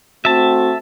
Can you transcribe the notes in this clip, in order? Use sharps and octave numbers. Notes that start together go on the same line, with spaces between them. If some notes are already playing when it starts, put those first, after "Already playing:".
A3 C4 F#4 E5 A5